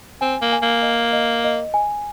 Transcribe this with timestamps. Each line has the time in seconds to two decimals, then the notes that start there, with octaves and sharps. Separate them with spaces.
0.21 C4 G#5
0.42 A#3
0.53 G#5
0.63 A#3
0.82 D#5
1.13 D#5
1.44 D#5
1.74 G#5